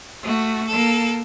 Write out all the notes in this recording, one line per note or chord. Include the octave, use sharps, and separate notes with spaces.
A3 F#4
A#3 A4